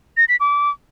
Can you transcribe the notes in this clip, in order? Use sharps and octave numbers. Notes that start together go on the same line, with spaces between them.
A#6
B6
D6